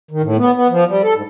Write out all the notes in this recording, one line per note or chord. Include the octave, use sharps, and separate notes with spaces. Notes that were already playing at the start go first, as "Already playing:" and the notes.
D#3
A2
B3
B3
F3
G3
A4
G#2